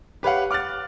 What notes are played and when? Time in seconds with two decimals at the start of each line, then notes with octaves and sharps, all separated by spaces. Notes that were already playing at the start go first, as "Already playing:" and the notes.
0.23 G4 B4 C#5 F5 F#5
0.51 D6 F6 F#6 A6